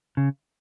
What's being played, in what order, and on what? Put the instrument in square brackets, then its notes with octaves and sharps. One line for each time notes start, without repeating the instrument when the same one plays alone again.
[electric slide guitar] C#3